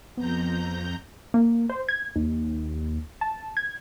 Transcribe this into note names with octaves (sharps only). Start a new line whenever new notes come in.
F2 B3 A#5 G6
A#3
C5
G#6
D#2
A5
G#6